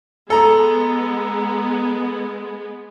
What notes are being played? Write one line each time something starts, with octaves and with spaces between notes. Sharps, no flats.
G#3 B3 A4 A#5